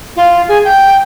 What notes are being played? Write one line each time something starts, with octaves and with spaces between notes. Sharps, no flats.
F4
G#4
G5